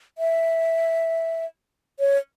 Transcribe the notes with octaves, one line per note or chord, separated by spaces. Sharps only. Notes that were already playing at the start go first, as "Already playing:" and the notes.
E5
C#5